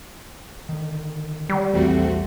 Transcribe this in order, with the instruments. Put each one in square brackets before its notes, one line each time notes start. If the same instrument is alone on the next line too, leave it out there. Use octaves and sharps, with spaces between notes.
[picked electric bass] D3 D#3
[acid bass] G3
[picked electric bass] A#1 E2 E3 [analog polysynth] A3 C4 F#4